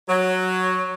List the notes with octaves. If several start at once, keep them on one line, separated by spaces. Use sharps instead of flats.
F#3